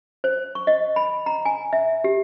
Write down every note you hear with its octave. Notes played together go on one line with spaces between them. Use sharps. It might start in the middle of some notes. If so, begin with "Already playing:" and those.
C5
C#6
D#5
B5
A#5
G#5
E5
G4